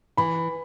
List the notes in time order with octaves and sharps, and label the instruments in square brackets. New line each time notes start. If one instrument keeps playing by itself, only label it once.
[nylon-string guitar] E3 [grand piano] B5